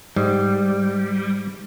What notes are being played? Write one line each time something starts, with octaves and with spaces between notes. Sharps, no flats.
G#2 G3